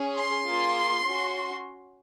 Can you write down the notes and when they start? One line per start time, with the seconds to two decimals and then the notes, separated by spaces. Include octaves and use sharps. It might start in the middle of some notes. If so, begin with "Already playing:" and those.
Already playing: C#4 G#4
0.17 C6
0.45 A#3 F4 G#4
1.05 C#4 F#4